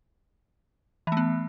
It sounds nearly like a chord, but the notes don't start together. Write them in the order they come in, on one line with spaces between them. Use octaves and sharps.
E3 A3 B3